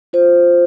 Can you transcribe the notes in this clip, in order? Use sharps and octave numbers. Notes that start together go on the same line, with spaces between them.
F4 C5